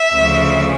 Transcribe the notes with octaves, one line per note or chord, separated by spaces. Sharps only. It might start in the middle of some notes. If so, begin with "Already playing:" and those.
Already playing: E5
D2 C#3 F3